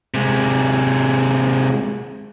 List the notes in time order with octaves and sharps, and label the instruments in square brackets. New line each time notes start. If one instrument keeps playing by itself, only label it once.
[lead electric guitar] C3 G#3